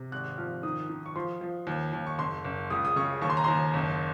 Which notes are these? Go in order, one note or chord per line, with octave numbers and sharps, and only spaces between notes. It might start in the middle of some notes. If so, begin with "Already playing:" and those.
Already playing: C3
G#1 F#6
F3 F6
D#3 D#6
D#3
C#6
F3 C6
F3
D#2
D#2
C#6
F#1 C6
F#1
C#2 D#6
D#6
C#3 C#6
D#2 C#6
C6
A#5
D#2 C6
F#1